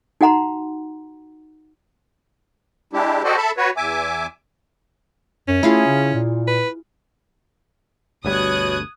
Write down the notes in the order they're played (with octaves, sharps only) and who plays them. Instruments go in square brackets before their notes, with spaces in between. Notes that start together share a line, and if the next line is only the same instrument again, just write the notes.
[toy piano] D#4 F#4 F#5 A#5 C6
[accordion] G#3 D4 E4 G4
F#4 G4 A4 C5 D5 D#5
A4 E5 A5 B5
F#4 B4 C#5
E2 E5 G#5 D6
[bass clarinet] F#2 [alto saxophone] C#4
[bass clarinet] A3 [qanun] E4 F4 G#4
[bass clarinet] C#3
A#2
[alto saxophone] B4
[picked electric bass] G1 D2 G3 [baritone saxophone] B2 [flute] C#5 [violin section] D#6 F#6 G#6